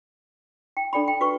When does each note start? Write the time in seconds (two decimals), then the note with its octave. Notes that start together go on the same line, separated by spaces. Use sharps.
0.77 G5
0.93 D4 A4 D5 G5 B5
1.08 G5
1.21 F#4 B4 C#6